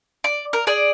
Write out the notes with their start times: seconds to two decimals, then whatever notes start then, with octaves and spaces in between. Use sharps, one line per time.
0.24 D5
0.53 A#4
0.67 G#4 D5